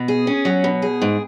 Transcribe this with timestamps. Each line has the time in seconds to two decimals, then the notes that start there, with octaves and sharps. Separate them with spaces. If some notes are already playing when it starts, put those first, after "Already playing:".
Already playing: B2
0.08 G#4
0.27 C#4
0.45 F#3
0.64 B2
0.82 G#4
1.02 G#2